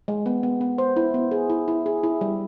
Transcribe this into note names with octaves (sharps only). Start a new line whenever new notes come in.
G#3
B3
B3
B3
C5
E4
B3
G#4
E4
E4
G#4
E4
G3